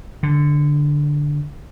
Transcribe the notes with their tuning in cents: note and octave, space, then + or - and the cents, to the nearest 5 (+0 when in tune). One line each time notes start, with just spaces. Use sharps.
D3 +0